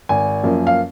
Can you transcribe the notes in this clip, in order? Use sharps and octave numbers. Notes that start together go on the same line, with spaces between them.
G#1 G#5
F#2 F3 A#3
F5